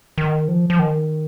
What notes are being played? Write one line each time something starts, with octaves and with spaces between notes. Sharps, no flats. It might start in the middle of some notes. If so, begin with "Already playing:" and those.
D#3
F3
F3
D#3